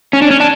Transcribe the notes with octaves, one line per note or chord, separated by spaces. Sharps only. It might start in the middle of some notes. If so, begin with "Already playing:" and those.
C#4
D4
C#4
D4